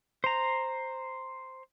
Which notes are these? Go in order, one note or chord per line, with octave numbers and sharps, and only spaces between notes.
C5 A#5